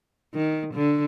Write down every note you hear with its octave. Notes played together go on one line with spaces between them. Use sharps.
D#3
D3